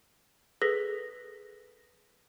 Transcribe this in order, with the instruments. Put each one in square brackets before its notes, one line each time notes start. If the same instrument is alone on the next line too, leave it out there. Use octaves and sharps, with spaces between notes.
[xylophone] G#4 A4 B4 A#6 B6